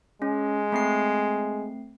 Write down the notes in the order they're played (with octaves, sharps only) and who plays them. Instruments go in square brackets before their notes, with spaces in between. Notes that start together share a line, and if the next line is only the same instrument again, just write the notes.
[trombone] G#3 [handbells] C#4
[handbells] A3 C4 C7